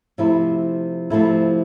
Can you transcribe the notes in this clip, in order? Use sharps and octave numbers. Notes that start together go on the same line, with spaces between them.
C3 F3 A3 E4
C3 F3 A3 E4